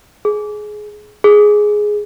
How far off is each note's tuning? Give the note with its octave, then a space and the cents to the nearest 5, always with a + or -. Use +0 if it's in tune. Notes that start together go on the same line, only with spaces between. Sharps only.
G#4 +20
G#4 +5